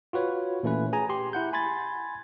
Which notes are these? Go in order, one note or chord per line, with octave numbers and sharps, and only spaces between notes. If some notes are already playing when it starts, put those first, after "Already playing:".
F4 F#4 B4 C#5
A#2 E3 A3 C#4 B4
G#4 G#5 A#5
G4 C6
E4 F#5 G6
G#5 B5 C6 G#6 A6